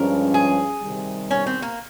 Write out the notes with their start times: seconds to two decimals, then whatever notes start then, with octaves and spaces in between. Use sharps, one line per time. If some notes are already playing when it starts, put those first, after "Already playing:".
Already playing: G2 F3 G#3 C#4 A#4
0.34 G#4
0.82 C3 D#3 G3
1.31 C#4
1.46 C4
1.62 A#3